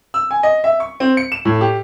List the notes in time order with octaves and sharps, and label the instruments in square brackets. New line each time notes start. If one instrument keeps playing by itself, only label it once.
[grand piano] E6
G#5
D#5
E5
C#6
C4
C#7
E7
A2
G4